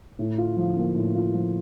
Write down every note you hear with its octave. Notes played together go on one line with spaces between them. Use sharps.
A2
F4
F3
A#3
A2
F4
F3